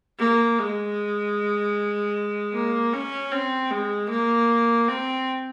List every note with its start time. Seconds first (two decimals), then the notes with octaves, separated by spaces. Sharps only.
0.19 A#3
0.59 G#3
2.53 A#3
2.92 C#4
3.31 C4
3.71 G#3
4.10 A#3
4.88 C4